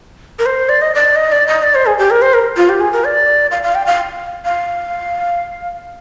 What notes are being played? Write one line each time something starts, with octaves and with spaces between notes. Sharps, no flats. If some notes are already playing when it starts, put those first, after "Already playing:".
A#4
C5
D5
D#5
D5
D#5
D5
D#5
D5
C5
G#4
G4
A#4
C5
A#4
F4
G4
G#4
A#4
D5
F5
F5
G5
F5
F5